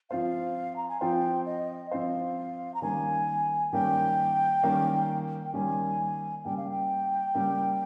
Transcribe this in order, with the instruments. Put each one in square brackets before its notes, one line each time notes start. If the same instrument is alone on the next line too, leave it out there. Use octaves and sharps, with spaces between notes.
[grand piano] F3 C4 F4 C5 [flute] F5
[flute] A#5
G#5
[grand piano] F3 C4 F4 C5 [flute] G5
[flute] D#5
[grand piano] F3 C4 F4 C5 [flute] F5
[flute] A#5
[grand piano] D#3 G3 A#3 C#4 [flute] G#5
[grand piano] D#3 G3 A#3 C#4 [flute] G5
[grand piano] D#3 G3 A#3 C#4
[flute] G5
[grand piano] D#3 G3 A#3 C#4 [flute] G#5
[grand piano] C#3 G3 A#3 [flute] G5
[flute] F5
G5
[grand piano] C#3 G3 A#3